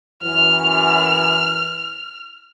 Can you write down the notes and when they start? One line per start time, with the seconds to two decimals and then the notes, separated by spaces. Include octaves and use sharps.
0.23 F#2 E3 F6